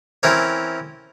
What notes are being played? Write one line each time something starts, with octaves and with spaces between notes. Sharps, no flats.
E3 C4 C#4 A#4 C#5